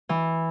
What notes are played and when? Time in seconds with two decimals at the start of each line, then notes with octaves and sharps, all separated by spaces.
0.09 E3